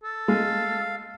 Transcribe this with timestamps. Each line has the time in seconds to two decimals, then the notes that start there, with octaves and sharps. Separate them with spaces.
0.04 A4
0.28 G#3 F5